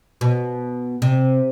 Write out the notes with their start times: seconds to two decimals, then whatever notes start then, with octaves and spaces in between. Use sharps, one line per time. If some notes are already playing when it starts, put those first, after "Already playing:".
0.21 B2
1.02 C3